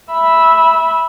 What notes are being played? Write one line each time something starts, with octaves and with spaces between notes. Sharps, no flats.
E5 B5